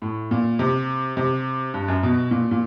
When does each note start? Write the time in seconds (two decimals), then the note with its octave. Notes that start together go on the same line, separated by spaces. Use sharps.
0.02 A2
0.31 A#2
0.59 C3
1.17 C3
1.74 G2
1.88 F#2
2.03 B2
2.31 A#2
2.51 A#2